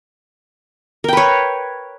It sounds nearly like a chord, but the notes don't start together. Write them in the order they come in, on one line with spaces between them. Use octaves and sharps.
A#4 G5 B4 C#5